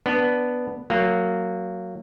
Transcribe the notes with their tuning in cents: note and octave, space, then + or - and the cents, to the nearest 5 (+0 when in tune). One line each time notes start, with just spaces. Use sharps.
B3 +0 D4 +0
F#3 -5 A#3 -20